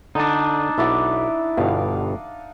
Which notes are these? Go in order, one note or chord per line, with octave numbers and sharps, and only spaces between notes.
D3 D4 D#4 A5
B1 E4 D5 F#5
G1 G2 B2 F5 F#5